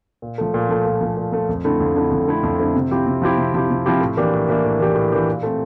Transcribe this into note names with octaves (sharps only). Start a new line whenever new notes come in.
A#2
F3 A3
A#2
F3 A3
A#2
F3 A3
A#2
F3 A3
F2
D3 A3 C4 E4
F2
D3 A3 C4 E4
F2
D3 A3 C4 E4
F2
D3 A3 C4 E4
C3
F3 C4 E4 G4
C3
F3 C4 E4 G4
C3
F3 C4 E4 G4
C3
F3 C4 E4 G4
A2
E3 A#3 D4 G4
A2
E3 A#3 D4 G4
A2
E3 A#3 D4 G4
A2
E3 A#3 D4 G4
A#2
A3 C4